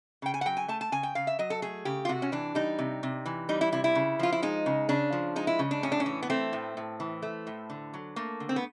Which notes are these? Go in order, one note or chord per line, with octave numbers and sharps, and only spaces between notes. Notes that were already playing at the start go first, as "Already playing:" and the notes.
C#3 G5
G#5
F#5
F#3 G5
G#5
A3 A5
A5
C#3 G#5
G5
C#3 F5
E5
F#3 D#5
A4
A3 G#4
C#3 G4
F4
C3 F#4
C#4
E3 D4
G3 D#4
C3
C3
E3
G3 D#4
E4
C3 E4
E4
C#3
F3 F4
E4
G#3 D#4
C#3
C#3 D4
F3
G#3 D#4
E4
C#3
D4
A2 C#4
D4
C#4
E3
B3
A3 C4
A2
A2
E3
A3
A2
D3
F#3
A3 A#3
D3
C4
B3